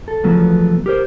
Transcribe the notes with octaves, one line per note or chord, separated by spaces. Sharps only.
A4
E2 C#3 F3 F#3 A3 B3
G4 A#4 C5